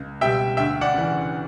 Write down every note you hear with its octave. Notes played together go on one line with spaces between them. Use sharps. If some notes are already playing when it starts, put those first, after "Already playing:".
Already playing: C#2
B2 G3 E5 G5
D2 E5 G5
D5 F#5
C#3 E3